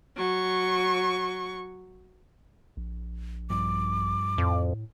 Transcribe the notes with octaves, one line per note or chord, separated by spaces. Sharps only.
F#3 C#6
A#1
G2 F3 D6
F2 A2